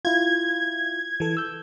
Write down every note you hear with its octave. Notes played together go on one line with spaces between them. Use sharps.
E4 F4 G#6
E3 A4
E6 G6